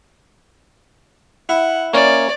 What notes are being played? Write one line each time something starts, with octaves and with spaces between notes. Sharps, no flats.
E4 F#5
A#3 C#4 C#5 D5